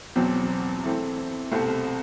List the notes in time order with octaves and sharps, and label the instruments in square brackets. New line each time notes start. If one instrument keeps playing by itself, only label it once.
[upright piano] E2 B2 F#3 C4
E3 A3 C4
C2 B2 A3 C4